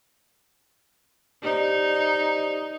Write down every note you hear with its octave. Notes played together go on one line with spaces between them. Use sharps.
D#4 G4 C5 D5